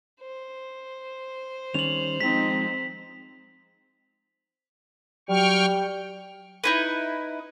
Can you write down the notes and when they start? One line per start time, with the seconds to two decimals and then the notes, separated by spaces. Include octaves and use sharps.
0.20 C5
1.74 D#3 G3 C#4 F7 F#7
2.20 F3 G#3 C4 D#4 B6
5.29 F#3 G3 G5 C#6 F6
6.64 D#4 E4 B4